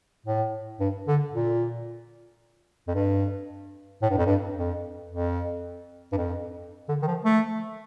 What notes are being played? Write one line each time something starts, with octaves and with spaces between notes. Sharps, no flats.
A2
G2
D3
A#2
F2
G2
A2
G2
F2
G2
F2
F2
G2
F2
D3
D#3
F3
A3